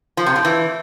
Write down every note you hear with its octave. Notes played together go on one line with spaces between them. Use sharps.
F3
C3
A2
E3